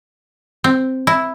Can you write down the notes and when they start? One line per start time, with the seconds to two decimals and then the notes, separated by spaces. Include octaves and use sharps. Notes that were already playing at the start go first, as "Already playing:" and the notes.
0.64 C4
1.07 E4